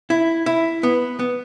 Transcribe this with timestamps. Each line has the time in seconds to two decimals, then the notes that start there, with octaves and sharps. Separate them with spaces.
0.10 E4
0.46 E4
0.83 B3
1.19 B3